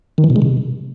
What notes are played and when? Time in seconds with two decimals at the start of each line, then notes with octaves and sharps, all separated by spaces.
0.18 D#3
0.24 E3
0.30 B2
0.36 G#3
0.42 C3